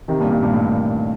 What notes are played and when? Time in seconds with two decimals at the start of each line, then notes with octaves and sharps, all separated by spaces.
0.08 C3 D#3
0.20 G2 A#2
0.31 G2 A#2
0.42 G2 A#2
0.53 A2